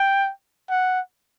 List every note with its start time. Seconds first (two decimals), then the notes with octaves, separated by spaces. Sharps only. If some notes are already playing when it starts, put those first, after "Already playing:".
Already playing: G5
0.70 F#5